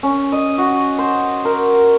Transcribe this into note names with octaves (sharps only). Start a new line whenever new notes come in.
C#4
D#5
F#4
C5
A#4